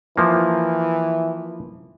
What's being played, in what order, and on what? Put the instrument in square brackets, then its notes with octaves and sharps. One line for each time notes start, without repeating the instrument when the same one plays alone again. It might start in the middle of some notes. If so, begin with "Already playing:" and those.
[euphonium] E3 [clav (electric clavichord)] F3 A#3